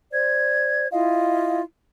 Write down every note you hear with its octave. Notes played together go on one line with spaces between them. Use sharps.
C5 D5 G#6
E4 F4 D#5 F5